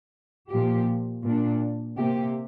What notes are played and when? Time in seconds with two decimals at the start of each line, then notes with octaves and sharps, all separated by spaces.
0.51 A#2 F3 A#3 G4
1.24 A#2 A#3 D4
1.97 C3 A#3 G4